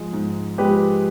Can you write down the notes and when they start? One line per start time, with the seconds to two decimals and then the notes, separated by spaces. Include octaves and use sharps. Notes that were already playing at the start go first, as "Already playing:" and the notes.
Already playing: G#2 F3 G#3
0.13 G#2
0.58 F3 G#3 G4 B4